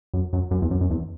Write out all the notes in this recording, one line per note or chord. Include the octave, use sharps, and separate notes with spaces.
F#2
F#2
F#2
E2
F#2
F#2
E2